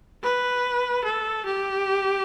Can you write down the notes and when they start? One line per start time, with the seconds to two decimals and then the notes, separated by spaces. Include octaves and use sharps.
0.23 B4
1.04 A4
1.45 G4